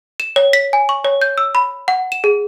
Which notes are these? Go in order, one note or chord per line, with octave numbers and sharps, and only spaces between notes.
E7
C#5
B6
G#5
C#6
C#5
G6
E6
B5
F#5
E7
G#4